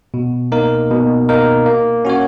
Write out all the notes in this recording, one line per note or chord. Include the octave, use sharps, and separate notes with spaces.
B2
A#3 D#4 A#4
B2
A#3 D#4 A#4
A#3
C#4 F#4 C#5